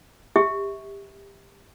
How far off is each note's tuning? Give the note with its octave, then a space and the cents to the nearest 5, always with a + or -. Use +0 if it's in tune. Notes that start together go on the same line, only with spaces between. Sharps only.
G4 +20 E5 -25